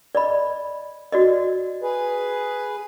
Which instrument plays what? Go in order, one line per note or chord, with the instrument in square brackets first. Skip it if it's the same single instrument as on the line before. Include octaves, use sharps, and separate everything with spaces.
[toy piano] D5 D#5 B5
F#4 D5 D#5
[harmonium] G#4 B4